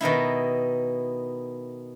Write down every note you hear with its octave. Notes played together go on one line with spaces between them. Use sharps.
B2 D#3 D#4 E4